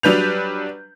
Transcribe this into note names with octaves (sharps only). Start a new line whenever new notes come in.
F#3 G3 D4 B4 G6 F7